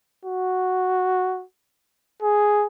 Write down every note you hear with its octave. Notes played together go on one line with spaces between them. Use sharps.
F#4
G#4